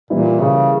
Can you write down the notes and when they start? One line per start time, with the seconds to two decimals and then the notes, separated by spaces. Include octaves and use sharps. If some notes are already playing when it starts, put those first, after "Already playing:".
0.10 A#2 E3 G3 A#3 E4
0.41 C#3